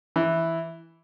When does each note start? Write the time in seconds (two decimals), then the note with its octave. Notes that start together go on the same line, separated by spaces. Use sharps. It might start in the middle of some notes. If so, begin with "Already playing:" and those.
0.16 E3